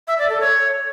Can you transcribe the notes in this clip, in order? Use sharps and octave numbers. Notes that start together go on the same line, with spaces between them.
E5
D5
A4
C#5